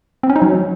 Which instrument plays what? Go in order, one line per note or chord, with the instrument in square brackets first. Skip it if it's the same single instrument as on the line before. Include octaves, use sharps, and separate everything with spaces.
[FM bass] C4
C#4
D#4
F#3